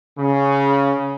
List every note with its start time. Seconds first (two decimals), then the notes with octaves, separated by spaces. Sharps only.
0.17 C#3